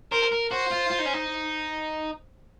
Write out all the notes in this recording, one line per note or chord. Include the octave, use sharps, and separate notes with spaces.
A#4 C5
A#4
F#4 C5
F4
F4
D#4
C#4
D#4